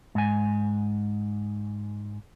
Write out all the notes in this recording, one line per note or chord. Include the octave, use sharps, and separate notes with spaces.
G#2 G#5